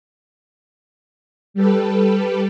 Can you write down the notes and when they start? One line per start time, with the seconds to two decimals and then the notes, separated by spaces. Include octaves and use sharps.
1.54 G3 G4 A4 B4